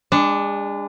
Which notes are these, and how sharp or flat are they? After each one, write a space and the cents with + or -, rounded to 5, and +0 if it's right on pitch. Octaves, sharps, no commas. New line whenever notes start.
G#3 -35 D4 +0